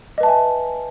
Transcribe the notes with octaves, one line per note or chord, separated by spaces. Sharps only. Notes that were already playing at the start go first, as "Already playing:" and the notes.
B4 D#5 E5 G#5 A5